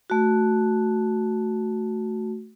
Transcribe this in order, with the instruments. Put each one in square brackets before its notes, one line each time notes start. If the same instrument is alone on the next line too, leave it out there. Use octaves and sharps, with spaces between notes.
[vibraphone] A3 F#4